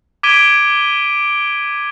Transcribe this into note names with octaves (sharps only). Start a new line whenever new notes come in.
D6 G#6 B6 D7 D#7 G7